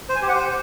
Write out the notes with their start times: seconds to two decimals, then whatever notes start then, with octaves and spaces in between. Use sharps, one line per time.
0.09 C5
0.15 G#5
0.22 G4
0.28 F#5
0.35 C5